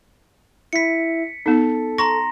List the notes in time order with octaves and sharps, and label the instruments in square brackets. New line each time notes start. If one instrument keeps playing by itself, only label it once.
[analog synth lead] E4 [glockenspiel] B6 C#7
[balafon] B3 D#4 [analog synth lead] A4
[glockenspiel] A#5 C6 A#6 [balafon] C#6